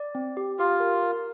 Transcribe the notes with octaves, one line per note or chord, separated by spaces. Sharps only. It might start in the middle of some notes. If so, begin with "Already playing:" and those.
Already playing: D5
C4
G4
F4 G4
A#4
A#4